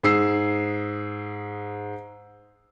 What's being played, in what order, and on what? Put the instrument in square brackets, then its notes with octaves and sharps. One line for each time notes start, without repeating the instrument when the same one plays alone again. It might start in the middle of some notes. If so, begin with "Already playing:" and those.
[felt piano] G#2 G#4 E6 C7